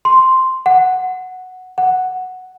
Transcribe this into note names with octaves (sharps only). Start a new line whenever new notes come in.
C6
F#5
F#5